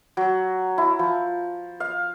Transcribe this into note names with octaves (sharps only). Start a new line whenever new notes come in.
F#3
E4
F3
F5